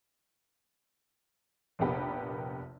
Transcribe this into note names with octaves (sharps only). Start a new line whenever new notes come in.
F1 A#1 A#3 B3 G4 B5